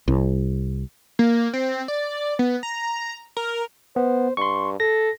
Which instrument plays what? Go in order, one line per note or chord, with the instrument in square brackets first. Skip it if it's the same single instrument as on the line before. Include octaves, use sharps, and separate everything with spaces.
[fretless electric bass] C2
[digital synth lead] A#3
C4
D5
B3
A#5
A#4
[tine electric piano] B3 [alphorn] C5
[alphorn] G2 [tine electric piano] C6 C#6
[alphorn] A4 [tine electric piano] A#6